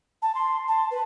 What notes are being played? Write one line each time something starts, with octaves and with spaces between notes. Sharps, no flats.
A5
C6
A5
B4